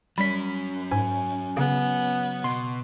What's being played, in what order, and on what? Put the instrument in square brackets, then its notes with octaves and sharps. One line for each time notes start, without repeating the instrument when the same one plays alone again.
[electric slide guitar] F#3 C#4 [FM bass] G3 [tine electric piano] B5 B6
[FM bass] G#2 [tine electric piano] G#5
[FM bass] C#3 [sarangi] B3
[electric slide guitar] B2 [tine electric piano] C6